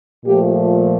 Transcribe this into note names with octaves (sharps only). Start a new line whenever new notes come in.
A#2 F3 A3 G4